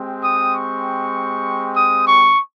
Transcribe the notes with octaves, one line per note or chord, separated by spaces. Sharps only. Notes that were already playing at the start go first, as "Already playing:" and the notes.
Already playing: G#3 C4 G4
D#6
C#6
D#6
C#6